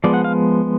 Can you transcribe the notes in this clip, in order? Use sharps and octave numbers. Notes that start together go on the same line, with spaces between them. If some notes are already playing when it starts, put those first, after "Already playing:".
F3 G#3 B3 D5
F#5
F5